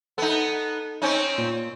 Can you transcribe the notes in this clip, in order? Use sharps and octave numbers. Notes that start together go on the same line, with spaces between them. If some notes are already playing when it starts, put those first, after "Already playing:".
B3 D#4 A4
C4 C#4 D#4
A#2